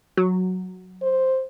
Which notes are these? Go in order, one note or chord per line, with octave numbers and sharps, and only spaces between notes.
F#3
C5